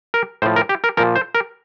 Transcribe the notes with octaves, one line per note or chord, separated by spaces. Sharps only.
A#4
A2 F3 C5
A#4
G4
A#4
A#2 F3 A#4
C5
A#4